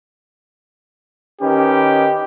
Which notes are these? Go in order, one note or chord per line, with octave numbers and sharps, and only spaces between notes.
D#3 C#4 G4 B4